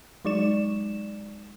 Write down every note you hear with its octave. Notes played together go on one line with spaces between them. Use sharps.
F#3 G#3 D#4 D5 C#6 E7